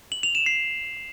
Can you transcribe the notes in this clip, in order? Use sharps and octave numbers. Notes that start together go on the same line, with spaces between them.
F#7
F7
E7
C7